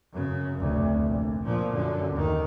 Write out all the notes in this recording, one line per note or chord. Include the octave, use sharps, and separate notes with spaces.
F#2 C#3
F1 D2
A#1
A#2 F3
F#2 D3
D#2 D#3